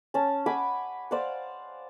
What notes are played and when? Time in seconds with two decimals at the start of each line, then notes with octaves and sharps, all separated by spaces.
0.14 C#4 A5
0.46 F#5 G#5 B5 D6
1.11 C5 D5 F5 F#5